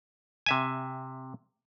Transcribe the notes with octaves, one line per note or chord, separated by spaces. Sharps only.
C3 E5 G#5